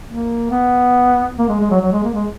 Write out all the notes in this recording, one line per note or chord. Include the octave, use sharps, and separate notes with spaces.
A#3
B3
A#3
G#3
G#3
F#3
F#3
G#3
A#3
G#3